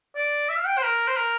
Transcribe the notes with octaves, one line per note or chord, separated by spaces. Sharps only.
D5
E5
F5
G5
C5
A#4
C5
A#4